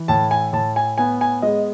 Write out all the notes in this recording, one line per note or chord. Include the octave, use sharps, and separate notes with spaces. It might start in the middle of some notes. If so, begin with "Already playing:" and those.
Already playing: E3
A2 A5
G#5
A2 A5
G#5
B3 G#5
G#5
G#3 D#5